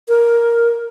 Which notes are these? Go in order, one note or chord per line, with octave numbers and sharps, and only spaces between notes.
A#4